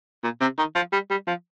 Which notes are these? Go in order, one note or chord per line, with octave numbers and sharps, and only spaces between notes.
A#2
C3
D#3
F3
G3
G3
F3